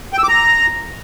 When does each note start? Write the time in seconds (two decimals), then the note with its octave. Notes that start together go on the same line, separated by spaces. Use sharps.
0.13 G5
0.18 E6
0.24 D6
0.29 A#5